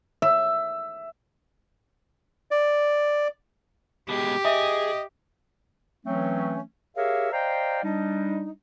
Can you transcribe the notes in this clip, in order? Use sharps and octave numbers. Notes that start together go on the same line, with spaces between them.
E5
D5
B2 G#3 G4
G#4 D#5 E5
E3 F#3 A3 C4 C#4
G4 G#4 A#4 C#5 E5 F5
C5 D5 D#5 F5 G5 A#5
G3 D4 D#4